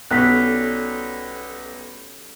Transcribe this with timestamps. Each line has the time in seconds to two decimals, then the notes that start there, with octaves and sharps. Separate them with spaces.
0.11 B1 G3 A3 C#4 F#6 B6